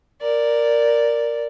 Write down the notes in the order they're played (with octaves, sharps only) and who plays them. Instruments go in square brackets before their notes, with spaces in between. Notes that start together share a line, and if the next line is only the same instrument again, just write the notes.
[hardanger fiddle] A#4 D5